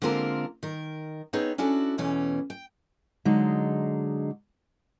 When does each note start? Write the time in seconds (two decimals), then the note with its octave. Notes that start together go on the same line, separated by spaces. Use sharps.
0.02 D3 G#3 A#3 C4 F4 A#4
0.63 D#3 A#4
1.33 B3 C4 D#4 G#4 C#5
1.58 C#4 D4 E4 F#4 A4
1.98 E2 B2 E3 A3 C#4
2.50 G5
3.25 D3 F#3 G#3 D#4